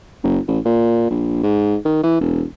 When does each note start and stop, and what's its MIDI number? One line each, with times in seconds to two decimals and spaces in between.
0.23 0.39 30
0.47 0.59 33
0.65 1.08 46
1.10 1.39 34
1.43 1.76 44
1.85 1.99 51
2.03 2.20 52
2.20 2.43 28